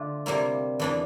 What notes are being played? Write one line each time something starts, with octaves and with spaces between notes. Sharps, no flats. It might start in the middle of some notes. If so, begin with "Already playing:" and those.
Already playing: D3 A3 D4 F4
C3 G3 A#3 E4
E2 E3 A#3 D4